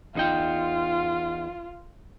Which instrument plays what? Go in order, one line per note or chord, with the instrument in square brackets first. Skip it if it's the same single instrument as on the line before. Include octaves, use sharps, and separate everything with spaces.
[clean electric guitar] E2 D#4 G5 [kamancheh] F4